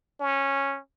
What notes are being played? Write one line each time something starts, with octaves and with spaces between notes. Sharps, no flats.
C#4